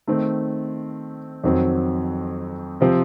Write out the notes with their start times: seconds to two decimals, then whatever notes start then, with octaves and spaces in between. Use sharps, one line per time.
0.07 D#3 A3 C4
1.44 F2 D#3 F#3 C4
2.81 C3 F3 C4